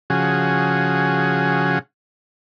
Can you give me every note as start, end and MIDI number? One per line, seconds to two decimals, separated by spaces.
0.10 1.79 49
0.10 1.79 53
0.10 1.79 66
0.10 1.79 68